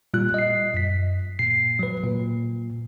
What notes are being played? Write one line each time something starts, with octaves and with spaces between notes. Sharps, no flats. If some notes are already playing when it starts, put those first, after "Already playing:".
A#2 G3 F4 F#6
D#5 C7
F#2 B6
A#2 C7
F#3 B4
A#2